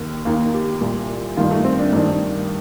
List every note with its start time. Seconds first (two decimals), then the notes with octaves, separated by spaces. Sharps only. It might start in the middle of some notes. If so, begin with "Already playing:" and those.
Already playing: D#2 D#3
0.25 D#2 D#3 A#3
0.54 G4
0.81 C2 A#2
1.37 G2 D#3 F4
1.51 A3
1.64 C4
1.79 D4
1.93 G2 D#3